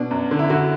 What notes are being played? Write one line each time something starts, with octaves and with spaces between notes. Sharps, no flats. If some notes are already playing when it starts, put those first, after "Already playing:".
Already playing: B2 D4
F#2
D3
E4
D3 F#4